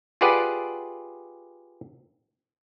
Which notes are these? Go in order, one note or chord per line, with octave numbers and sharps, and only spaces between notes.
F4 G4 G#4 B4 D5 F#5